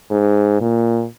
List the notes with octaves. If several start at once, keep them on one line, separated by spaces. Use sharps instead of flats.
G#2
A#2